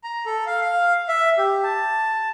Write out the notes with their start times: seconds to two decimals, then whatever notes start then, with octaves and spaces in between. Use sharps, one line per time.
0.04 A#5
0.26 A4
0.47 F5
0.61 F5
1.08 E5
1.38 G4
1.63 A5